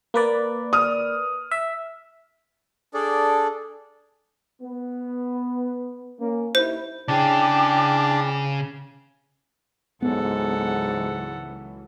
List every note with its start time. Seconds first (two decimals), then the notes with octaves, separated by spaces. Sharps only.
0.14 A#3 B4 D5
0.73 D#6 F6
1.51 E5
2.94 D4 G#4 A4 D5
4.62 B3
6.19 A#3 C#4
6.55 D#2 E4 C5
7.08 C#3 D4 E4 G#4 G5 D6
10.02 C#2 G#2 E3 F#3 B3 A4 F#5